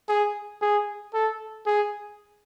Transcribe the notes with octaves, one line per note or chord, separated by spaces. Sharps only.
G#4
G#4
A4
G#4